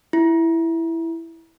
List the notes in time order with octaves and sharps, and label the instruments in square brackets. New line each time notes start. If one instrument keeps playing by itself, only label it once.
[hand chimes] E4